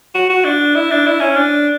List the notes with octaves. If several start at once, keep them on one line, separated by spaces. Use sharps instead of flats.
F#4
F#4
D4
E4
D4
E4
C#4
D4